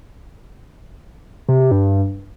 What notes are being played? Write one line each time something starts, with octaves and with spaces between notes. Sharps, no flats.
C3
C3
G2